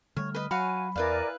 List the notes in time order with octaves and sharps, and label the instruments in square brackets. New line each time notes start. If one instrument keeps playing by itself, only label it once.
[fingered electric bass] D3 G3 A3 [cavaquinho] C#5 [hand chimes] F6
[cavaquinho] B4 D#5
[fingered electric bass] F#3 [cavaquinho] F#4 C#5 F5 [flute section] G#5 [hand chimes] B5
[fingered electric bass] E2 [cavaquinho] E4 B4 F5 [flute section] A#4 D5 G#5